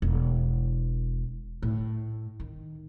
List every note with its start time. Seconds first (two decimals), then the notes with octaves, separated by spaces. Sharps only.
0.02 E1
1.62 A2
2.40 D#3